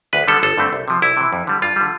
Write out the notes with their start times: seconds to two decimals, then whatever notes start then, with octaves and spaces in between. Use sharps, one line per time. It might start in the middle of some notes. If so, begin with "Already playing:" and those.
0.13 D2 B4
0.28 D3 G3 B3 A4
0.43 G1 A4
0.57 G2 D3 A3 C4
0.73 C2
0.88 C3 F3
1.02 C2 E4
1.17 C3 E3
1.33 F2
1.47 D3 G3
1.62 G2 F4
1.76 D3 G3